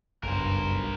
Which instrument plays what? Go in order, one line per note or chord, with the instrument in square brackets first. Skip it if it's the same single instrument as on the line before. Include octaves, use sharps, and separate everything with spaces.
[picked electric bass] F#1 [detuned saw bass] B1 [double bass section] G2 [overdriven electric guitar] A#4 C5